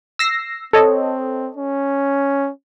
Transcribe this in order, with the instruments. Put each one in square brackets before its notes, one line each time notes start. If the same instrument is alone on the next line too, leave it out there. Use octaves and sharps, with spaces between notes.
[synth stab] E6 A#6 C7
[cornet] C4 [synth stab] A4 C#5 D#5
[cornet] C#4